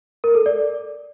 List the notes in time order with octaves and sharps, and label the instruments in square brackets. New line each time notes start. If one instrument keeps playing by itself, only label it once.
[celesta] A#4
A4
D5